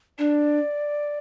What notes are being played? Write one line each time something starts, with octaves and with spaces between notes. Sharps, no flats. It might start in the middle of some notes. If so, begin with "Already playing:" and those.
D4 D5